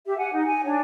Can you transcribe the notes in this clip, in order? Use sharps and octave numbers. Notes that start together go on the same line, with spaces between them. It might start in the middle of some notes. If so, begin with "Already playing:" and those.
G4 E5
F#5 G#5
D#4
G#5
D4 C#5